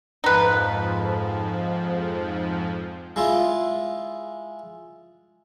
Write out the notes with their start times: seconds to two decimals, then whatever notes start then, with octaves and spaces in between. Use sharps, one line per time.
0.24 F2 G#2 F3 D#4 B4
3.16 G#3 E4 F4